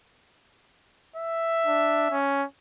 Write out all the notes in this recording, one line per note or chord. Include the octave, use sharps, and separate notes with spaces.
E5
D4
C#4